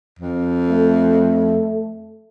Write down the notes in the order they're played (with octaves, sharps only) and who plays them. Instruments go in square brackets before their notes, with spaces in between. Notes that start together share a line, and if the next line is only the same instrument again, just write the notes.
[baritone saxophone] F2
[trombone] A3